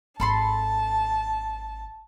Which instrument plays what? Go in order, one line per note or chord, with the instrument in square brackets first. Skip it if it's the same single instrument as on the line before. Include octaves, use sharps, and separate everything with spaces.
[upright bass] G#1 [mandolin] A4 B5 C6 [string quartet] A5